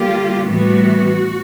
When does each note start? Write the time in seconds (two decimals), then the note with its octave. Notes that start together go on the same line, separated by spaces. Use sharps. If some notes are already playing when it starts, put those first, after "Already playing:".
Already playing: D3 G3 A#3 F4 G4
0.46 A2 E3 G3 B3 F#4